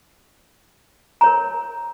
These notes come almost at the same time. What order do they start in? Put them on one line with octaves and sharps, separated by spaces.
A#5 C#5 A#4